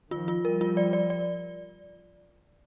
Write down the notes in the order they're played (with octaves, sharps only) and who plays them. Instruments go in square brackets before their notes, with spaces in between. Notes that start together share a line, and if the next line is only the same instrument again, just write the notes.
[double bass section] D#3 F3 [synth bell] F4
[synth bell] F4
[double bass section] F3 G3 [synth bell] A#4
[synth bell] F4
D5
D5
D5